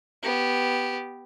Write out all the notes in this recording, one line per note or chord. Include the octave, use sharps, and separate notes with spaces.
B3 G4